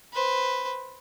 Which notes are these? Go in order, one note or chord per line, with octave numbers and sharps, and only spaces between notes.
B4 C5